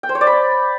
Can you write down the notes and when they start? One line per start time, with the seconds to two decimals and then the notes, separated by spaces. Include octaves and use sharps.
0.03 G5
0.09 C5
0.15 C#5
0.21 D5
0.27 B5